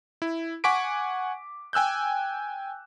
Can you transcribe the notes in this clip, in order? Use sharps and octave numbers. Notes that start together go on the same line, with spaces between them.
E4
F#5 G#5 C#6 D6 B6 D7
G5 G#5 E6 F#6 G6